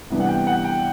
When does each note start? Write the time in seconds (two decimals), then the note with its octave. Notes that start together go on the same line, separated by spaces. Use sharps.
0.10 C3 E3 G3 B3 D4
0.20 F#5
0.29 G5
0.47 F#5
0.64 G5